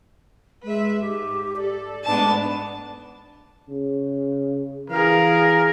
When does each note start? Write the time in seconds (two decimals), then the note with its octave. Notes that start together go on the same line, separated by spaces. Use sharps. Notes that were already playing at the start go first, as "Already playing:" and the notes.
0.64 G#3 B4 E5
1.00 G#2 G4
1.56 A4 D5
2.04 G#2 A3 B3 D4 A5
3.69 C#3
4.90 E3 G#4 A#4 F5